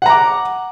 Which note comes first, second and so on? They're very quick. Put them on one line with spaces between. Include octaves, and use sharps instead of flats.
F#5 A#5 D6